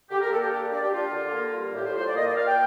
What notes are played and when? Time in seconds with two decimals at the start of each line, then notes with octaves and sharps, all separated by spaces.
0.09 D3 G4
0.20 A#4
0.30 A#3 A4
0.41 G4
0.51 D4 G4
0.71 D4 D5
0.81 G4
0.91 D4 F4
1.12 D3
1.33 A#3
1.54 G3
1.74 A2 G4
1.84 C5
1.95 F4 C5
2.05 D5
2.15 A#3 D#5
2.26 D5
2.36 A#3 F5
2.46 G5